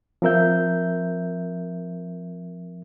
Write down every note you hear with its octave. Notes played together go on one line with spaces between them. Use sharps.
F3 C4 A#4 E5 G6